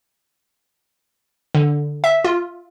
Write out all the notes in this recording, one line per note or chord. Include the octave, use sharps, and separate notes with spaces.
D3
E5
F4